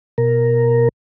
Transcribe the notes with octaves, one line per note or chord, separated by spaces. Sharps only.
B2 A#4